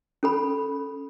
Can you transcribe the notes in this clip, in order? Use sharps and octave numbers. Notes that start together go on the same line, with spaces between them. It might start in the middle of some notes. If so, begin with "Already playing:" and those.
C#4 A4 B5